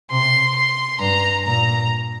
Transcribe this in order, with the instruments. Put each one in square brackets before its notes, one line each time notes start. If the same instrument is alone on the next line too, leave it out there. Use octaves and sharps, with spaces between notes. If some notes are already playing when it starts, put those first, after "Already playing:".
[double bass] C3 [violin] C6
[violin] C6
[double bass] G2 [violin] A#5
[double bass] A#2 [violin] A#5